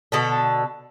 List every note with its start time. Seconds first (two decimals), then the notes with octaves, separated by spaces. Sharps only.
0.12 B2 D3 A4